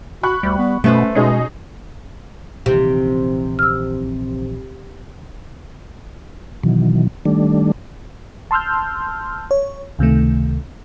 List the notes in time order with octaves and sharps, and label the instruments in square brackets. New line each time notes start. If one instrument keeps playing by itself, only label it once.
[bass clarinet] F#4 [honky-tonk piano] B5 C#6 F#6
[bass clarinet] D2 [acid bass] G3
[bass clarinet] B3
[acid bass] B2 [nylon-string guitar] A3 B4 C5 [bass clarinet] C#4
[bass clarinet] B2 [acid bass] G#3 [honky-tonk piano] C#4 D#4 G#4
[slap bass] A#1 D#3 E3 [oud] C3 [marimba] G4
[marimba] E6 F6
[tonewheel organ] B2 D#3 E3 F#3
D#3 G3 A3 D4
[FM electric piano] A5 C6 E6 F6 G6
C#5
C#2 C3 D#3 A3